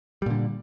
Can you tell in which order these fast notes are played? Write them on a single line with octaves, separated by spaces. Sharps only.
G3 A#2 D3